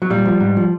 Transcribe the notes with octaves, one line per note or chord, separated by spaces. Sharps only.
F#3
A#2 G3
F3
G#2
F3